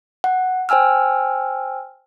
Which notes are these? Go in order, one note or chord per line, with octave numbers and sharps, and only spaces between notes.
F#5
C5 G5 G#5 E6 F6